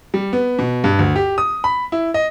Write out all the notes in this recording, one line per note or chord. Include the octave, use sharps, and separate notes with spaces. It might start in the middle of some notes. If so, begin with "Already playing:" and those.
G3
B3
B2
G2
D2
G4
D#6
B5
E4
D#5